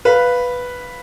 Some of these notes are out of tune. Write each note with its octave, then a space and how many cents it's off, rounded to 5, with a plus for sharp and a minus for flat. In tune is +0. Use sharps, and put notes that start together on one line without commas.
B4 +0 F5 +0